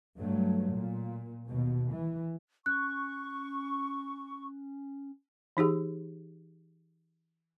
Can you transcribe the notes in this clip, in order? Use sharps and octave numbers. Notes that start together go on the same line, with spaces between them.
G2 F#3 A3
A#2
D#2 B2
E3
C#4 C#6 F#6
E3 D#4 G4 G#4